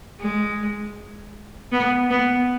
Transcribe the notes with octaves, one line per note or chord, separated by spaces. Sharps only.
G#3
B3
B3